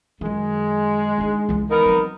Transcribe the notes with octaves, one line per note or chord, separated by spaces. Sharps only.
F#2 D#3 G#3
D4 D#4
C#2 E3
B3 D#4 A#4
F#3 C4